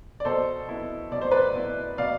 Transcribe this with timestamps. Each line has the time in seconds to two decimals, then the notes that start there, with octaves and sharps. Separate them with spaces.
0.20 D5
0.25 B2 A4 C5
0.69 B3 E4
1.12 B2 D5
1.21 C5
1.31 B4 D5
1.55 B3 E4
1.98 B2 D5 F5